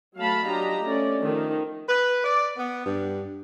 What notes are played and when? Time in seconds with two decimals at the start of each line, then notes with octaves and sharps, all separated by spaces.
0.16 F#3 A3 F5 A5 B5
0.46 F#3 D4 F4 G4 D#5 A#5
0.85 A3 C#4 D5
1.20 D#3 F3 A3
1.89 B4
2.25 D5
2.57 B3
2.86 G2